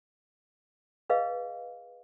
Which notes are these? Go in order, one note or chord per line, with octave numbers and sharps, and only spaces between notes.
G#4 B4 D#5 F5